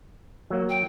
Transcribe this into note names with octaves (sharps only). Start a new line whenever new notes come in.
F#3 A#3
G5